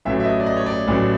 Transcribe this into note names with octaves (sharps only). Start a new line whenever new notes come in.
A1 A2 F#3 E5
E5
D#5
D5
D#5
C#5
D5
A1 A2 F#3 D5